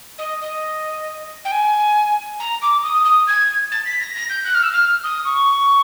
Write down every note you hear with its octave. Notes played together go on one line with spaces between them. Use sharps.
D#5
D#5
G5
G#5
A#5
D6
D#6
D#6
G#6
A6
B6
A#6
A#6
G6
F#6
F6
E6
F6
D#6
C#6